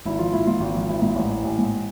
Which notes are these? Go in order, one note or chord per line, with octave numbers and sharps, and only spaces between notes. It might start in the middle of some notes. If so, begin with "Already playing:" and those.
G#1 E4
F3 F4
G#1 E4
G#2 F4
G#1
F3
G#1 E4
G#2
A1
E3
A1
G#2